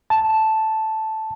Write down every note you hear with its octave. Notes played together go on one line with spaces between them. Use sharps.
A5